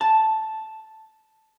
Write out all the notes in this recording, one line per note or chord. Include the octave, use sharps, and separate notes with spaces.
A5